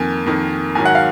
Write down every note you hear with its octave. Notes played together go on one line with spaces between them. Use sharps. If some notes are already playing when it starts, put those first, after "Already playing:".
Already playing: F2 D#3 A#3 G#5
F2 D#3 A#3
G#2 D#3 F#3 G#5
F#5
F5